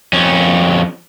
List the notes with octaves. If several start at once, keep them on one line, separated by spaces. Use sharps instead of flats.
F2 C#4